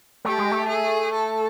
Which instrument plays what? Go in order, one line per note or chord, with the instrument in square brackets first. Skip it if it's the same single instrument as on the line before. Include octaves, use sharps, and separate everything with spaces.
[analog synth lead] A3 [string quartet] G4
[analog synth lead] G#3
A3
[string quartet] G#4
A4